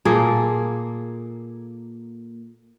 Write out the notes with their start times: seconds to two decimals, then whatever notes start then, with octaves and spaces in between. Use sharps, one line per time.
0.05 A#2 A#3 G#4 A4